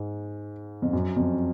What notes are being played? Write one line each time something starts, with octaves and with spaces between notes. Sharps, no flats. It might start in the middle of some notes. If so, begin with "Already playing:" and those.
Already playing: G#2
F2
F#2
F2